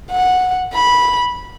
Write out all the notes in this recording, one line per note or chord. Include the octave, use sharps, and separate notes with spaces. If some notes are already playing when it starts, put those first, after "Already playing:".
F#5
B5